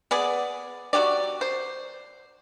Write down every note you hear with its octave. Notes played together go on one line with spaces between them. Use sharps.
B3 G#4 D5
F#3 F#4 G4 D5
C5